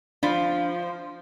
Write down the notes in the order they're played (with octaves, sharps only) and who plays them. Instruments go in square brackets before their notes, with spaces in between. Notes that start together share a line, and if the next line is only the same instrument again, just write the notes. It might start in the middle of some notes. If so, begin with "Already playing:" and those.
[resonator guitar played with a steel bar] F3 [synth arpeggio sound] D4 B5 A6